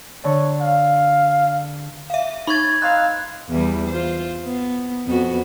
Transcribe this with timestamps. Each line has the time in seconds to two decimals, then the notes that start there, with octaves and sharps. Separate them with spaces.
0.24 D3 C#5
0.61 F5
2.10 E5 F5
2.47 D#4 B5 C#6 G#6 A6
2.82 C4 D#4 F5 F#6
3.49 E2 E3 G3
3.88 F4 C5
4.43 B3
5.06 F2 B3 F#4